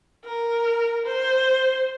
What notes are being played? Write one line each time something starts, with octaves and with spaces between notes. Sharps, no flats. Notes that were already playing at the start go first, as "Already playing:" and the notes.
A#4
C5